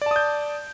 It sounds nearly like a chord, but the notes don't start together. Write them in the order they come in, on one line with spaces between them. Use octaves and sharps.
D5 A5 D#6 G6